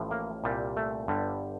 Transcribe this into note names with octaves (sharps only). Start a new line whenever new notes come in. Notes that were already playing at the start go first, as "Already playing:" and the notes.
Already playing: A1 A2 F3
A#3
C2 A#2 G3
A3
G1 G2 D3 G3